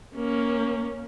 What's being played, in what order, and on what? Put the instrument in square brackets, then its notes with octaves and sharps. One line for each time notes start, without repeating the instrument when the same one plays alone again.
[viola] A#3 C#4